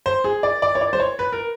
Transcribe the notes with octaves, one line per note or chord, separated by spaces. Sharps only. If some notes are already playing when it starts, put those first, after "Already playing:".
C5
G#4
D5
D5
C#5
D5
C5
C#5
B4
A#4